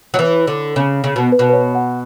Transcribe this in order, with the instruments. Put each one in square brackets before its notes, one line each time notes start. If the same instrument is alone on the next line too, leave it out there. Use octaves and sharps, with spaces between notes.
[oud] F#3
E3
D3
C#3
C#3
B2
[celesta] B4
[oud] B2
[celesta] B4
C#5
F#5